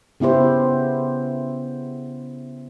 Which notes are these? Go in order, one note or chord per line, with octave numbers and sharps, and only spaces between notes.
C#3 B3 E4 G4 C5